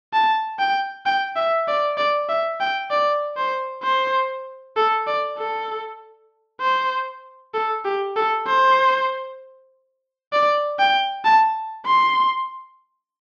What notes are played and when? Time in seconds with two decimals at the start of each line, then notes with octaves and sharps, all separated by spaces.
0.13 A5
0.59 G5
1.06 G5
1.36 E5
1.68 D5
1.98 D5
2.29 E5
2.60 G5
2.91 D5
3.37 C5
3.83 C5
4.77 A4
5.07 D5
5.38 A4
6.61 C5
7.54 A4
7.85 G4
8.16 A4
8.47 C5
10.33 D5
10.79 G5
11.25 A5
11.86 C6